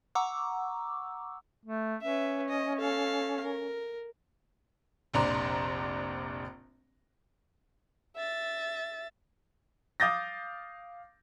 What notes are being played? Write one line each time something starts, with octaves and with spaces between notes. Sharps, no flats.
F#5 A#5 C#6 D6 E6
A3
C#4 B4 E5
D#5
A4 F5
A#4
F1 A#1 D4 A#5 C6
E5 A6
F5 D6 D#6 G6 A6 A#6